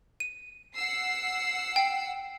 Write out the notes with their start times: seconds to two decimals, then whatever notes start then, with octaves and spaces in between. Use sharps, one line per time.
0.20 D#7
0.76 F#5 E6 C7
1.76 G5